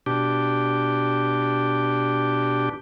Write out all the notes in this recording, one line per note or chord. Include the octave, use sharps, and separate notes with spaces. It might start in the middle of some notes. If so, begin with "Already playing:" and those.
B2 D4 G4